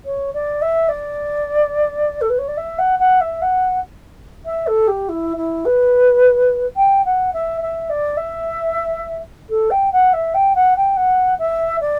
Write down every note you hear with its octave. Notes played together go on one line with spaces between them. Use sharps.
C#5
D5
E5
D5
A4
B4
C#5
D5
E5
F#5
F#5
E5
F#5
E5
A4
G4
E4
E4
B4
G5
F#5
E5
E5
D5
E5
A4
G5
F#5
E5
G5
F#5
G5
F#5
E5
D5